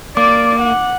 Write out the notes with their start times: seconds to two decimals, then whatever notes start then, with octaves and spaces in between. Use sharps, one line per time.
0.17 A#3 D5 D6
0.61 F#5